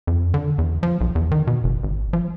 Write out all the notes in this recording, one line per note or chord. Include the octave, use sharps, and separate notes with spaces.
F2
D3
E2
F3
B1
E2
D#3
B2
F#1
G#1
F3